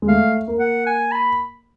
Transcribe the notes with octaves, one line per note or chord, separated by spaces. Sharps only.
G#3
A3 F5
A#3
F#5
G#5
B5